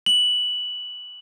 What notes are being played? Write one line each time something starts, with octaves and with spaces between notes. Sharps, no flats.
F#7